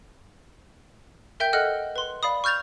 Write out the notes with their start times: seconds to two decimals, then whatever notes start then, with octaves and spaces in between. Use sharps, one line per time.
1.40 A#4 E5 G5 G6
1.53 A4 D#5 F#5 F6 F#6
1.96 B4 C6
2.23 D5 F5 B5 D#6
2.44 C#6 F6 G6 A6 F7